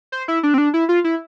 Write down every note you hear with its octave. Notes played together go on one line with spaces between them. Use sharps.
C5
E4
D4
C4
D4
E4
F4
E4